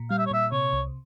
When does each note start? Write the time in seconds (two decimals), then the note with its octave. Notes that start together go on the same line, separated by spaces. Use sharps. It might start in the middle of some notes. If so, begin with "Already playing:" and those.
Already playing: A#2
0.10 G3 F5
0.18 E5
0.26 C#5
0.31 A#2 E5
0.52 C3 C#5
0.73 C2